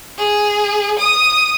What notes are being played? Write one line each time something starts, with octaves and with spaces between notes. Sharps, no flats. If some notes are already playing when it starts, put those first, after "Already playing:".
G#4
D#6